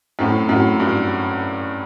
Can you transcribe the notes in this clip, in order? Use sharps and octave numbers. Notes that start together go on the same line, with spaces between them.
F#2 A2 C4
F#2 A2 F#4
G2 F#4